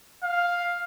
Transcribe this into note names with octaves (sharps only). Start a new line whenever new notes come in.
F5